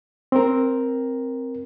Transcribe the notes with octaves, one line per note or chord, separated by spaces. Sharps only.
C4 A#4